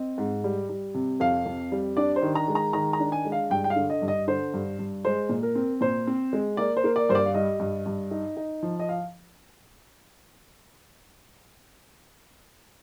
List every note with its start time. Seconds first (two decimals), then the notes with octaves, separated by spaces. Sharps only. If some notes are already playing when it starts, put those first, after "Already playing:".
Already playing: C4 D#5
0.18 G#2
0.44 G3
0.69 G3
0.94 C3
1.20 F2 F5
1.45 F2
1.72 G3
1.97 D4 D5
2.16 C5
2.22 D#3
2.35 A#5
2.48 G#3
2.55 A#5
2.73 D#3 A#5
2.93 A#5
3.00 D4
3.12 G#5
3.25 G#3
3.32 F5
3.50 G2 G5
3.64 G5
3.70 F5
3.76 D3
3.90 D#5
4.02 G2
4.08 D#5
4.28 D3 C5
4.54 G2
4.79 G2
5.05 G#3 C5
5.29 A#2
5.43 A#4
5.55 C4
5.81 A#2 C5
6.07 C4
6.33 G#3
6.57 A#3 D5
6.77 C5
6.84 A#3
6.96 D5
7.09 G2 C5
7.15 D5
7.26 F5
7.34 G3 D#5
7.60 G2
7.86 G2
8.11 D#4
8.37 D#4
8.63 F3
8.79 D#5
8.89 F5